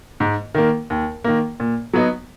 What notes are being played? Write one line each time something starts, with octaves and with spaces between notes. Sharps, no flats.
G#2
D#3 A#3
D#2
D#3 A#3
A#2
F#3 B3 D#4